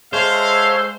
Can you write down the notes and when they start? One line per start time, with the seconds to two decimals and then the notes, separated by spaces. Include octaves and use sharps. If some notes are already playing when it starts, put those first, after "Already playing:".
0.13 G#3 A4 C5 C#5 E5 F5